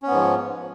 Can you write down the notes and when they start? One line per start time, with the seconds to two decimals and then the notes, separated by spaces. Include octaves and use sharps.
0.03 C#4
0.07 B3
0.11 G#2
0.15 F3